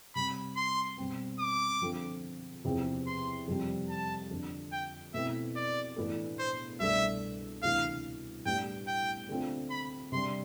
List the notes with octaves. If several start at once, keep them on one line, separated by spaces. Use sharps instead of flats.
C3 G3 C4 B5
C6
B2 G3 C4
D6
D3 F3 C4 F4 A4
E2 C3 F3 C4
C6
F2 C3 G3 C4 G4
A5
F2 D3 F3
G5
B2 A3 C4 E4 E5
D5
A2 E3 B3 D4 A4
C5
C2 B2 A3 D4 E5
D2 C3 E3 F5
A2 G3 B3 D4 G4 G5
G5
D3 A3 C4 F4
B5
C3 G3 D4 C6